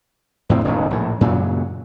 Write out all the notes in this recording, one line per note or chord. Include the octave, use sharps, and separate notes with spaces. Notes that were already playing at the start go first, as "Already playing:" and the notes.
E2 A2 C4
E1 C#2 A2 D#3
A#1 A2
F#2 A#2 C#3 F#3